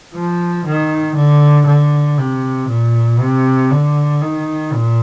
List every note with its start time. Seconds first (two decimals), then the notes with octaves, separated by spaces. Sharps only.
0.14 F3
0.66 D#3
1.16 D3
1.67 D3
2.18 C3
2.69 A#2
3.20 C3
3.71 D3
4.22 D#3
4.72 A#2